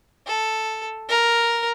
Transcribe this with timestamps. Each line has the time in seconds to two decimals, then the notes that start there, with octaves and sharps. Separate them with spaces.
0.27 A4
1.09 A#4